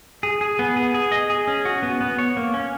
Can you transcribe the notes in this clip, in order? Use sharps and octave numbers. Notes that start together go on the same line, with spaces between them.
G#4
G#4
B3
G#4
G#4
D#5
G#4
C#4
F#4
B3
B3
C#5
A#3
C#4